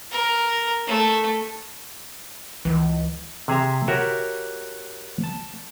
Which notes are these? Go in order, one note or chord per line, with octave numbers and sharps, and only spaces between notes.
A#4
A3
C#2 E3
C3 G#4 E5 A#5
F#4 G4 A#4 C#5 E5
A5